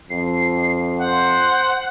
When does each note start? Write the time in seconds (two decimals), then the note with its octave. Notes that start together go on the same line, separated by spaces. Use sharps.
0.10 F2 C7
0.98 C5 F#5